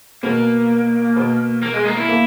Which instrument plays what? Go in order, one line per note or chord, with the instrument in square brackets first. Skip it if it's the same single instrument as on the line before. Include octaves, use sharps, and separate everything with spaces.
[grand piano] B2 B3 [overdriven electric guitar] A#3
[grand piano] B2 B3
[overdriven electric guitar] A#3
G#3
A#3
E4
[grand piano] A#3